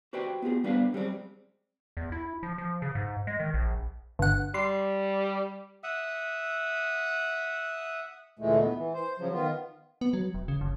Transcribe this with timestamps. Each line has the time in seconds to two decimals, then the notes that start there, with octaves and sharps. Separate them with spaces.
0.13 F#4 G4 B4 C5 D5 G5
0.42 B3 F4 G4 G#4
0.64 G3 B3 D4 B4 C5 F5
0.93 F#2 G3 G#3 C4
1.97 E2
2.12 E4
2.43 F3
2.58 F3
2.82 C#3
2.95 G#2
3.27 G#3
3.40 D#3
3.54 A#1
4.19 G1 F#5
4.54 G3 C6
5.83 E5 F#5 D#6
8.39 D2 A#2 E3 G#3 A3
8.59 B3
8.75 E3
8.94 C5
9.18 C#3 F3 F#3
9.32 D#3 B3 F4
10.01 B3
10.13 F#3
10.34 E1
10.48 C#3
10.61 F#1